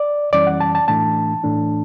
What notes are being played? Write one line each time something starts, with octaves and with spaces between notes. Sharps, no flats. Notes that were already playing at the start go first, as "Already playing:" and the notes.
Already playing: D5
F#2 E3 G3 C#4 D5
F#5
A5
A5
A2 E3 A3 D4 A5
A2 E3 A3 D4